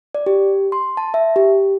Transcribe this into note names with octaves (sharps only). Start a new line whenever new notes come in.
D5
G4
C6
A5
E5
G4